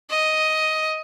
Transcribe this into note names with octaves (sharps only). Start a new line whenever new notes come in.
D#5